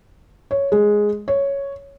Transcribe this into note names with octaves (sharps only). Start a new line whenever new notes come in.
C#5
G#3
C#5